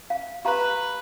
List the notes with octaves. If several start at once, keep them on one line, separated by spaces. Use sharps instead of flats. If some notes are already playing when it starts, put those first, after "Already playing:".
F5
G4 B4 F5 A#5